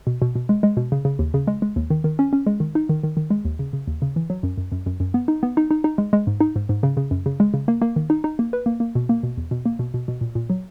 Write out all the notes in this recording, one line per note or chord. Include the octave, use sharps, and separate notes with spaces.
B2
B2
B2
G#3
G#3
B2
C#3
C#3
D#2
C#3
G#3
G#3
D#2
D#3
D#3
C#4
C#4
G#3
D#3
D#4
D#3
D#3
D#3
G#3
D#2
C#3
C#3
D#2
C#3
E3
F#3
F#2
F#2
F#2
F#2
F#2
B3
D#4
B3
D#4
D#4
D#4
G#3
G#3
G#2
D#4
G#2
G#2
C#3
C#3
F#2
C#3
G#3
C#3
A#3
A#3
D#3
D#4
D#4
A#3
B4
A#3
A#3
B2
A#3
B2
E2
B2
A#3
B2
B2
B2
A#2
A#2
F#3